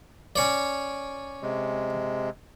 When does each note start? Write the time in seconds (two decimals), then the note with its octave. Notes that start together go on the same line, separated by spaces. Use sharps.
0.36 C#4 C#5 D5
1.42 C3 G#3